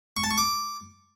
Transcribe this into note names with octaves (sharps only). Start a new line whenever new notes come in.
C#6
A5
C#6
D6